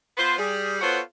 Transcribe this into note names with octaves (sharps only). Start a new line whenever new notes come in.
B3 F4 B4 C5
G3 G#4
B3 F4 F#4 A4 C5 C#5